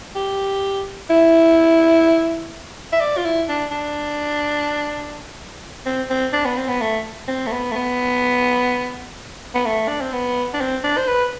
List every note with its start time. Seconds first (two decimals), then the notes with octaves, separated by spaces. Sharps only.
0.15 G4
1.10 E4
2.92 E5
3.01 D5
3.17 F4
3.25 E4
3.49 D4
3.71 D4
5.86 C4
6.10 C4
6.33 D4
6.45 B3
6.57 C4
6.68 B3
6.81 A3
7.28 C4
7.46 A3
7.52 B3
7.71 A3
7.76 B3
9.54 B3
9.65 A3
9.88 D4
10.01 C4
10.13 B3
10.54 D4
10.61 C4
10.84 D4
10.97 C5
11.07 B4